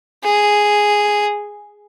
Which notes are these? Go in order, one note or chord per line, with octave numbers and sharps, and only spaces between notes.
G#4